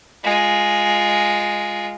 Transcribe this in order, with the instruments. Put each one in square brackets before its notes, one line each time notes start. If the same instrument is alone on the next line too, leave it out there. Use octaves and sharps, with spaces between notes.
[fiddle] G#3 F4